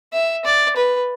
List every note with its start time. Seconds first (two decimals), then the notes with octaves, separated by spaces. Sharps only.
0.13 E5
0.45 D5
0.76 B4